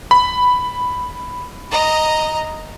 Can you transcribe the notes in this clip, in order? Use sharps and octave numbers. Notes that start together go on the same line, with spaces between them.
B5
D#5 A#5